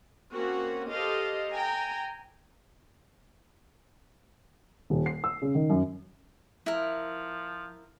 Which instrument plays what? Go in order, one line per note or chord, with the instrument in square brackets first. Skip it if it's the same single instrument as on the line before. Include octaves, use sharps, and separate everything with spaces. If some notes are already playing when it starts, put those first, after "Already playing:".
[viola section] A#3 C4 C#4 F#4
G4 A4 C5 D#5 F5
G5 G#5 A#5
[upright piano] D#1
C7
E6
C#3
D#3
F#2
[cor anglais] F3 [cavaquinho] E4 A#4